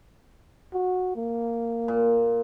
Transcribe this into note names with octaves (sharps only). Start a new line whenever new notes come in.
F#4
A#3
A#2